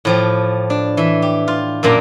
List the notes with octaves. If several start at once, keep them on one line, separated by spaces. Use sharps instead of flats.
A2 F3 G4
D4
E3 E5
G4
F4
F#2 A#2 A#3 D4 A#5